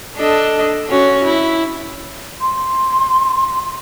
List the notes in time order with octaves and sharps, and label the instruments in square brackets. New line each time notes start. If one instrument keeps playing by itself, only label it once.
[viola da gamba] D4 A4 D#5
C#4 F#4
E4
[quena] C6